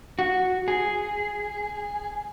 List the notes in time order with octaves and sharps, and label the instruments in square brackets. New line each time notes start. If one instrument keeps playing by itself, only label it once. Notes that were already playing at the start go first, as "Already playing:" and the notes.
[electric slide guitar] F#4
G#4